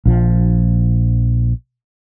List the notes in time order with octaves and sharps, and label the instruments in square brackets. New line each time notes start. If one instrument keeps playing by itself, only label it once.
[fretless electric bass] A#1 F3